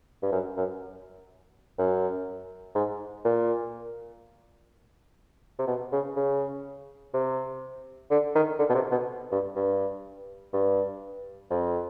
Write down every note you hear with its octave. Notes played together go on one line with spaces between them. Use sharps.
G2
F#2
F#2
F#2
G#2
A#2
C3
B2
C#3
C#3
C3
D3
D#3
D3
B2
C3
B2
G2
G2
G2
F2